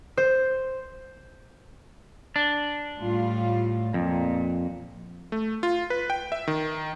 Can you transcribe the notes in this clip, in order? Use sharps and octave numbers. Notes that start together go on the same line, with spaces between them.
C5
D4
A2 G3 F4
F2 A#2
A3
F4
B4
G5
E5
D#3